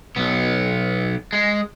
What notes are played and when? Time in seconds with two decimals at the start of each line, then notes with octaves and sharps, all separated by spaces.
0.16 B1 B3
1.33 G#3